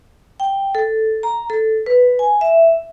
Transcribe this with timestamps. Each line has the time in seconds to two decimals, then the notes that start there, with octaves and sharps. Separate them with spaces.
0.40 G5
0.75 A4
1.23 A#5
1.50 A4
1.86 B4
2.19 G#5
2.41 E5